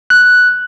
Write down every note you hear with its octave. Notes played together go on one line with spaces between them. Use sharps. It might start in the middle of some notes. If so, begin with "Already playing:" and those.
F#6